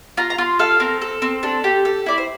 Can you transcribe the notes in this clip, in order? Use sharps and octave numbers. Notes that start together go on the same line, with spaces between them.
F4 A#5
A#5
F4 C6
A4 F5
C4 A#4
A4
C4
D4 A4
G4
A4
E4 D5
C5